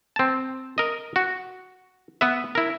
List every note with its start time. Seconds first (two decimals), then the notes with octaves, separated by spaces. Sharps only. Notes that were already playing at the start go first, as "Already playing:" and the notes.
0.16 C4 A5
0.78 A#4 D#5
1.16 F#4
2.21 B3 B4 E5
2.55 E4 A#4